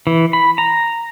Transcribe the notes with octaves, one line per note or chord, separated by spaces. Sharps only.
E3
B5
A#5